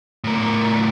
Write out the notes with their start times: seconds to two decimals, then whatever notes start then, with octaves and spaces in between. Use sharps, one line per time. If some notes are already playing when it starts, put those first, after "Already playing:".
0.24 A2 A#4